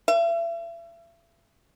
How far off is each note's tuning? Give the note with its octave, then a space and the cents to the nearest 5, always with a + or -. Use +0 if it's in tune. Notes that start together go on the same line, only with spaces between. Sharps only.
E5 +40